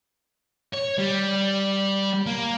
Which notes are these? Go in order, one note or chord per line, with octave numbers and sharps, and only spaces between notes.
C#5
G3
A#3